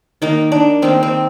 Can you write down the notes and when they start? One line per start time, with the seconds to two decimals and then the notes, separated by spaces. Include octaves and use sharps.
0.22 D#3 A#3 D#4
0.52 D4
0.82 D#3 A#3 C4
1.03 C4